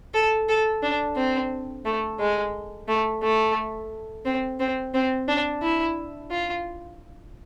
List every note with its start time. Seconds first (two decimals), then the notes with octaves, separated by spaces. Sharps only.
0.14 A4
0.49 A4
0.83 D4
1.16 C4
1.85 A3
2.19 G#3
2.88 A3
3.23 A3
4.25 C4
4.60 C4
4.94 C4
5.28 D4
5.62 E4
6.31 F4